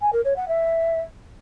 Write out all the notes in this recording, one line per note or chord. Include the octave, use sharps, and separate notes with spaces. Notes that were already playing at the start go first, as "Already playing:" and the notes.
G#5
A#4
C#5
F#5
E5